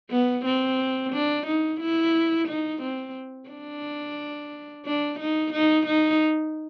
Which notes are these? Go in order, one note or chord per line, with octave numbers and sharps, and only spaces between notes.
B3
C4
D4
D#4
E4
D#4
C4
D4
D4
D#4
D#4
D#4